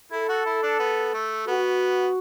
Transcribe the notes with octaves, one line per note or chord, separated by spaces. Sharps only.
E4 A4
F#4
E4
D4
B3
A3
B3 F#4